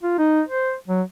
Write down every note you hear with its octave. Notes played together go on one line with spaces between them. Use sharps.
F4
D#4
C5
F#3